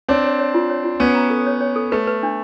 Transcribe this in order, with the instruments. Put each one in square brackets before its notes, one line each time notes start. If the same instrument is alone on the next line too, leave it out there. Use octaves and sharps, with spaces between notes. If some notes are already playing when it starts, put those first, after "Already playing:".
[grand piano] C4 D4 [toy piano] C#5
[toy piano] C#5
C#5
F4
C#5
F4
[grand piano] B3 C#4 [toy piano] C#5
[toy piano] A#5
A4
C#5
C#5
A4
[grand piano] A3 [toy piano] B4
[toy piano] B4
D4